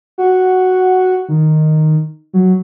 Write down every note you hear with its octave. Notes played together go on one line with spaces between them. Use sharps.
F#4
D#3
F#3